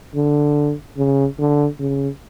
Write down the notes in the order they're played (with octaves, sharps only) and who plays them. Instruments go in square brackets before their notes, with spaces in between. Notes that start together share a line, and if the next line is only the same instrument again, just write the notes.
[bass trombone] D3
C#3
D3
C#3